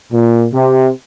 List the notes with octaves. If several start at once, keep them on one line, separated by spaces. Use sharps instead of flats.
A#2
C3